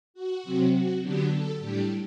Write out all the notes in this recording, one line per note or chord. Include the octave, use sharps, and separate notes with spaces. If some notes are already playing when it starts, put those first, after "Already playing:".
F#4
C3 F#3 C4
F#4
D3 F#3 B3 D4 G4
A4
A2 G3 D4 G4